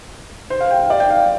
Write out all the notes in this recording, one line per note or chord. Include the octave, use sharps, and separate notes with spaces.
C5
F5
G5
F5
D5
G5
F5